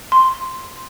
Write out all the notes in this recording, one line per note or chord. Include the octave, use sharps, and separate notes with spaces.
C6